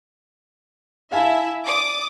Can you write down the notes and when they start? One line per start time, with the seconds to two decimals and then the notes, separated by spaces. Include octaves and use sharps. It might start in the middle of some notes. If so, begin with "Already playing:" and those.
1.12 E4 E5 F5 G#5 A5
1.66 D5 D6 D#6